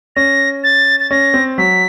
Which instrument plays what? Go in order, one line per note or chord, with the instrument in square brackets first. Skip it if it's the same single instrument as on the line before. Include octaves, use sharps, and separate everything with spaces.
[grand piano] C#4 [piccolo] A#6
[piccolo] A6
A6
[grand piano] C#4 [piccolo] A#6
[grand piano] C4
[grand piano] F#3 [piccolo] B6